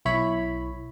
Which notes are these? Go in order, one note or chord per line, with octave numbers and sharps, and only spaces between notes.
B1 E4 C#5 B5